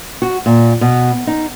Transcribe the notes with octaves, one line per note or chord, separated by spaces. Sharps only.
F#4
A#2
B2
D#4